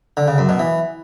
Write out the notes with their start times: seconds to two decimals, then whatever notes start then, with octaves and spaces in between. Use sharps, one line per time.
0.17 D3
0.28 C#3
0.38 F#2
0.49 B2
0.59 E3